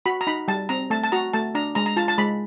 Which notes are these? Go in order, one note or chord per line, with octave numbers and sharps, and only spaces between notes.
F#4 B5
A#5
D#4 B5
G3 A5
C4 A#5
A3 A5
A5
F#4 A#5
A3 A5
D4 A#5
G#3 A#5
A#5
F4 A5
A5
G#3 B5